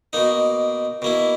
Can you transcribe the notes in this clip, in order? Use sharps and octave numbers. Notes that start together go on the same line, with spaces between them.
B2 A#3 D#4
B2 A#3 E4